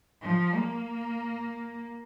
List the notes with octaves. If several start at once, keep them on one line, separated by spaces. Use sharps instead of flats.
F3
A#3